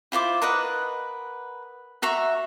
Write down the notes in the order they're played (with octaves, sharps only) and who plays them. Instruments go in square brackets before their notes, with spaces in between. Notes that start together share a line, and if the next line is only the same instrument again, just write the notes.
[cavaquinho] E4 F4 C5 D6
A#4 B4 D#5 F#5
F#4 E5 A#5 C#6